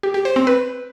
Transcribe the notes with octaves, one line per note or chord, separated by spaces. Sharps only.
G4
G4
C5
C4
B4